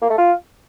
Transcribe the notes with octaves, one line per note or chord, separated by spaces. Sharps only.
A#3
A3
F4